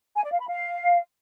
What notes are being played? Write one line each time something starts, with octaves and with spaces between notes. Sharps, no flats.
G#5
D5
F5
B5
F5